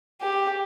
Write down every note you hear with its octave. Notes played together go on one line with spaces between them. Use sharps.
G4